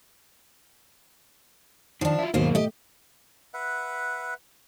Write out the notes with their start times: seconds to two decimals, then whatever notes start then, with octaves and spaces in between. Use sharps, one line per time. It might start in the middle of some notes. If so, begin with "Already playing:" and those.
2.01 D#3 F3 D4
2.19 E4 F4
2.34 D#2 G#2 B2 F#3 A#3 C5
2.55 A3 G4 D#5
3.54 B4 E5 F#5